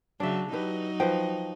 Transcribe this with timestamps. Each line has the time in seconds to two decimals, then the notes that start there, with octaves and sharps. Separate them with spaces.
0.20 C#3 F#3 D4 E5
0.52 F#3 D#4 E4 G4 B4
1.00 F3 B4 C5 G5